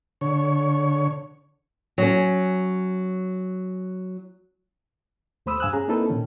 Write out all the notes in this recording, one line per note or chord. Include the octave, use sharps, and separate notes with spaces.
D3 C#5
F#3 C#4
D#2 A3 C5 B5 D#6 E6
G2 F5 G#5 D#6 E6 F#6
C#4 G#4 A#5
A#3 C4 D#4 E4 A4 B4
A#2 D#3 C#4